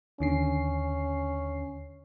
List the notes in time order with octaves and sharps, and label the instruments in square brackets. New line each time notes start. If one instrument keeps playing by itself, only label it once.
[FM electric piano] D#2 D3 C7 [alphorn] C#4